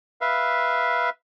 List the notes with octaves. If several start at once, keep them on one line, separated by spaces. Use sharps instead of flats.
B4 E5 F5